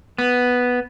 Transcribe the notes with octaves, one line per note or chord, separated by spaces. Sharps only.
B3